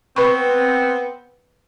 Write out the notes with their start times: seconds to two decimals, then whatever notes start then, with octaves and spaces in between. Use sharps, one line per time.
0.16 B3 C4 B4 B5 C#6